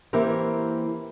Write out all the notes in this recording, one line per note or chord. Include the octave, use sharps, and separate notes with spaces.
E3 A#3 C4 E4 G4 A#4